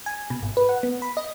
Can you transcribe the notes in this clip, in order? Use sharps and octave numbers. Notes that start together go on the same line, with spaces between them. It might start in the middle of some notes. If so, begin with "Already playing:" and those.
G#5
B2
G#1
B4
F#5
B3
B5
D#5